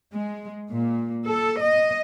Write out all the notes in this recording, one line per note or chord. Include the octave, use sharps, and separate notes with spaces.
G#3
A#2
A4
D#5